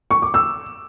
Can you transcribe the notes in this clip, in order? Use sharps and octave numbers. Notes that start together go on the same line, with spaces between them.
C#6
D6
E6